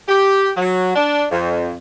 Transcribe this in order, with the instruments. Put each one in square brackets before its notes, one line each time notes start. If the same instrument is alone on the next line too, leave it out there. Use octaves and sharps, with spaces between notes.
[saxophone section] G4
F#3
D4
F2